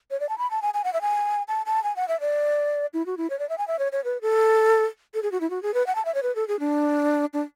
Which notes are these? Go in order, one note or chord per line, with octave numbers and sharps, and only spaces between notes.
C#5
D5
A5
B5
A5
G#5
G#5
F#5
E5
G#5
A5
A5
G#5
F#5
E5
D5
E4
F#4
E4
C#5
D5
E5
G#5
E5
C#5
C#5
B4
A4
A4
G#4
F#4
E4
F#4
G#4
B4
F#5
A5
E5
C#5
B4
A4
G#4
D4
D4